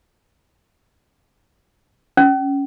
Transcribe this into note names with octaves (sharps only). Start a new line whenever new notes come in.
C#4